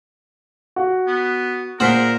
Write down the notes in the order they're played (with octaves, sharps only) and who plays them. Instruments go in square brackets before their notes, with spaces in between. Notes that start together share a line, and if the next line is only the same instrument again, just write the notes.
[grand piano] F#4
[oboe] B3
[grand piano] A#2 B6 G7 [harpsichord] G#4 C5 F#5 [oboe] A#4